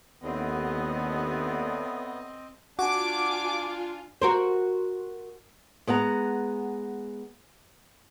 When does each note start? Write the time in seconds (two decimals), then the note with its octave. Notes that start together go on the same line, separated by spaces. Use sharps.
0.24 D#2 A2 D3 B3 C4 D#5
2.79 D4 F4 F#4 G#5 D6
4.22 F#4 A#4 C5
5.87 G#3 B3 F#5 A#5